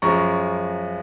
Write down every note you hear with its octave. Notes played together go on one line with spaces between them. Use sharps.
F#2 F3 G#3 A#5 C#6